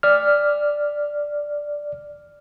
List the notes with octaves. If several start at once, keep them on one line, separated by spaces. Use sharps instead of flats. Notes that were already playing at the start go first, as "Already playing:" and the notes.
D5 F6